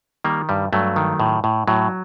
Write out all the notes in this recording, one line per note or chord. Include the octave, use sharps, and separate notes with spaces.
D#3 G3 A#3
G2 G3
G2 F#3 A3
D#3
A2
A2
A2 F#3